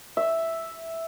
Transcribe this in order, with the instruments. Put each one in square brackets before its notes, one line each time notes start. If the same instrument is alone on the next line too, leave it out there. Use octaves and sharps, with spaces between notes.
[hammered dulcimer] E5